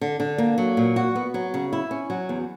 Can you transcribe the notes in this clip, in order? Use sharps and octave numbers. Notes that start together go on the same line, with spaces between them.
D3
D3
A#3
F#3
A#2
F#4
B3
F#3
C#3
E4
C#4
F#3
E2